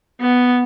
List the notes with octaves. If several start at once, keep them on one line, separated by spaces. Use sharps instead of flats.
B3